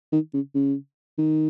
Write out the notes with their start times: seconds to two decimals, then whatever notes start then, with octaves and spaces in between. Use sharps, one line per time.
0.12 D#3
0.34 C#3
0.55 C#3
1.18 D#3